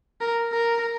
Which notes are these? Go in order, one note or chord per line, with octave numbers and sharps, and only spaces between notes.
A#4
A#4